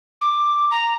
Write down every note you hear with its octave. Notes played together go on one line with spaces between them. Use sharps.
D6
A#5